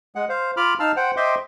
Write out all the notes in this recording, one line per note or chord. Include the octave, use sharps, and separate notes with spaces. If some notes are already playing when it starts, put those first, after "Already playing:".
G#3 F#5
C5 F5
F4 B5 D6 F6
D#4 F5 A5 E6 F6
C5 F#5 G5
C5 D#5 E5 G5 C6 D6